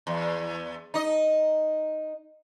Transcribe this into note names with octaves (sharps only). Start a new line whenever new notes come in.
E2
D#4 D#5